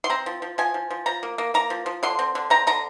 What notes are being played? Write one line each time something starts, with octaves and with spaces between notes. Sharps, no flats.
C6
C4 A#5
F3
F3
F3 G#5
F3
F3
F3 A#5
A#3
A#3
A#3 A#5
F3
F3
D3 C6
C4
D3
C4 A#5
D3 A#5